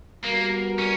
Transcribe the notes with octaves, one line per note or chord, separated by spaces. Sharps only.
G3 A#3 B3 F#4 A#4
C#4